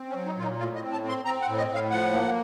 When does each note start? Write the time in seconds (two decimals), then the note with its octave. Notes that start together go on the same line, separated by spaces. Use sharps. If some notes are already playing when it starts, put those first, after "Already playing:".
Already playing: C4
0.09 C#4
0.15 F#3
0.26 D#4
0.37 A#2 F4
0.42 D#4
0.59 A2 F4
0.75 D#5
0.81 C4
0.92 A5
1.03 C4
1.09 C6
1.25 C4 A#5
1.42 F#5
1.47 A2
1.58 D#5
1.69 A2
1.75 F5
1.91 F3 F#5
2.13 A#3